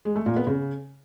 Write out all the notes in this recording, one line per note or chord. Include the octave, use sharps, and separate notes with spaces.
G#3
A3
A#2
B3
C#3